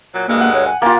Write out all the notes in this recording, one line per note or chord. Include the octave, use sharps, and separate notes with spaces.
A#2 F#3
D2 G2 G#3 A#3
F#5
C#5
G#5
A#3 C#4 F4 G4 A6